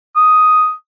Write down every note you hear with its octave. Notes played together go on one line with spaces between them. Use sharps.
D#6